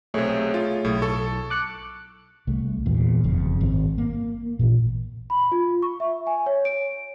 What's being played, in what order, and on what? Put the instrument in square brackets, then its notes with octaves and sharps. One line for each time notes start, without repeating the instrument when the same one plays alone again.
[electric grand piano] B1 C3 [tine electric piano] A3 G#4 C#5
[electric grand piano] F4
[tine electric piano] B1 [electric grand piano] A2
[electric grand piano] A4 C#6
[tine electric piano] D6 F#6 C#7
[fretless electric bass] C2 A3
E2 A#2
F#1 F2 C#3
G#1 C4
A#3
A1 A#2
[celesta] B5
F4
C#6
E5
G#5
C#5
D7